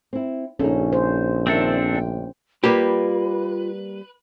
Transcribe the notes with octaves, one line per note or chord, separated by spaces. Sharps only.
C4 E4
A#1 C#4 D#4 G#4 A4
C5
D#3 C4 D4 A4 A#4 E5
D2 G5
G3 A#3 F4 G4 B4